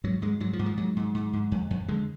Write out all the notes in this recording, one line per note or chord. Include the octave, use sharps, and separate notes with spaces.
G#2 F#3
G#2 G#3
G#2 F#3
F3
G#2
F3
G#2 F#3
G#2
G#2
G#2
F2
F2
D3 G#3